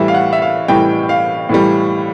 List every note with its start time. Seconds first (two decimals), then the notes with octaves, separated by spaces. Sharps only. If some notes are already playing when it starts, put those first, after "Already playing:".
Already playing: A2 E3 G3 E5
0.08 F5
0.14 F#5
0.33 E5
0.42 F5
0.68 A2 E3 G3 G5
1.09 F5
1.49 A2 E3 G3